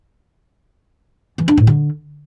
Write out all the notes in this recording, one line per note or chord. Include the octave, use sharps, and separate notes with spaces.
E3
D4
A2
D3